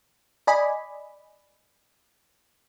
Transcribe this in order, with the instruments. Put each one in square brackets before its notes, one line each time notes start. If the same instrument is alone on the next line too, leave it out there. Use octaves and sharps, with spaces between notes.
[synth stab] D5 D#5 G#5 B5